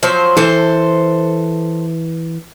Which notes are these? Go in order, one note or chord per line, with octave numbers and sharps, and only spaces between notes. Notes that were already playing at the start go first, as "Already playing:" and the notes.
F3 F#3 C5
E3 A4 C5